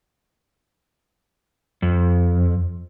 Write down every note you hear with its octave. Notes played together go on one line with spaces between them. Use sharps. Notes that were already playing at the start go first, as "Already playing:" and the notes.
F2